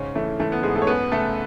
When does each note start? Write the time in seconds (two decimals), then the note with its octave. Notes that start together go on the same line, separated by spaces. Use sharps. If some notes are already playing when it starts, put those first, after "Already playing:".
Already playing: G#2 C#3 C#4
0.15 E3 A3
0.39 E3 A3
0.52 B3
0.63 G#2 G#3 G#4
0.75 A3 A4
0.82 C#5
0.87 F#2 B3 B4
1.11 C#3 A3 A4